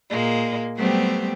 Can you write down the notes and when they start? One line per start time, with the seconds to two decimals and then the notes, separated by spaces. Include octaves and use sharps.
0.11 A#2 G#3 A#3
0.77 F#3 G3 A3 B3 C4 G4